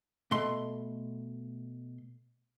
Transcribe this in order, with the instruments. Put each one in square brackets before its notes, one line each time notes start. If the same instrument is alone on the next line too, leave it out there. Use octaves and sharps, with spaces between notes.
[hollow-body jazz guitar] B2 A3 C6